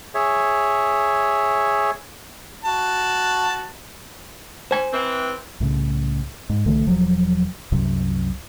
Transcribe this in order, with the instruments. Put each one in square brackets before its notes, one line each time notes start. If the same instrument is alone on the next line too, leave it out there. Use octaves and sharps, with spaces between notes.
[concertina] G#4 C#5 E5
[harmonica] F#4 A5
[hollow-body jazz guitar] C5 G#5
[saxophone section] E3 C4
[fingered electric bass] C2 A2 C#3
G#2
B1 D3 E3 A3
E1 F3 F#3
C2 F#2 C3 F#3